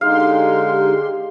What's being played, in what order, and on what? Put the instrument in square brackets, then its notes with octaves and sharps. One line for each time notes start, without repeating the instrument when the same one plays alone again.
[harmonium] D3 G#3 D#4 [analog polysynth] G4 G#4 C6 [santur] F5